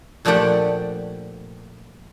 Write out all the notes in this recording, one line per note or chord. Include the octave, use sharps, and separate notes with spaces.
A#2 F3 A3 D4 G4 F#5